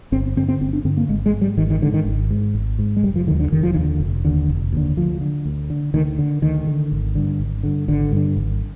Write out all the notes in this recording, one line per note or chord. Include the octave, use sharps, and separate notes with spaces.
G1 C4
G2 D3 C4
C4
G1 C4
D4
G2 D3 C4
A#3
G#1 G#3
G#3
G#2
G3
G#1 D#3
D#3
G#2 D3
D#3
G#1
G#2
G#1
G#2
G#3
F1 G3
F3
D#2 D3 D#3
D3
F1 D#3
F3
D#2 D#3
D3
F1
D#2 D3
F1
D#2 D3
D2 F3
D3
D2
D3
D2 D#3
D3
D2 D#3
D3
G#1
G2 D3
G#1
G2 D3
G#1 D3
G2 D3
G#1